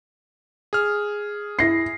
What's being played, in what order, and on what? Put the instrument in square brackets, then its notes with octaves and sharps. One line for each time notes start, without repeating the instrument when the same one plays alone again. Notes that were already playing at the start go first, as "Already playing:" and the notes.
[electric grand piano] G#4 F6
[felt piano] E4 A#6 C7